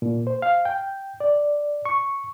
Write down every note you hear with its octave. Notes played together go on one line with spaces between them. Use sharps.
A#2
C5
F5
G5
D5
C#6